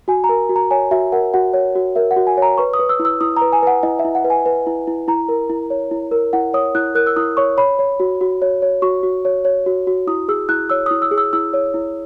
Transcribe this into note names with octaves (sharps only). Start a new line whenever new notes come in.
F#4 G#5
A#5
A#4
F#4
A#5
C#5 G#5
F#4 E5
A#4 F#5
F#4 F#5
C#5
F#4
A#4 E5
F#5
F#4
G#5
C#5 A#5
B4 C#6
D#6
B4
E6
E4
E6
E4 D#6
B4 A#5
G#5
B4 F#5
E4 D#5
E5
E4
F#5
B4
G#5
B4
E4
E4
E4 A#5
A#4
E4
C#5
E4
A#4
E4 F#5
C#5 D#6
E4 F#6
A#4 F#6
E6
E4 D#6
C#5 C#6
C#5 B5
C#5
F#4
F#4
C#5
C#5
F#4 C#6
F#4
C#5
C#5
F#4
F#4
E4 D#6
G#4 E6
E4 F#6
C#5 E6
E4 D#6
E6
G#4
E6
E4 E6
C#5
E4